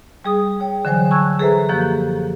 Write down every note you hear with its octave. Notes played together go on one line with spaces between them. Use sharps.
G3 G#4 D#6
C#5 G5
D3 E3 F#3 C5 G#5
A5 C#6 E6 F#6 G#6
G#4 A4 B4 C5 E5 A#5
F#2 F3 A#3 G4 F#6 G6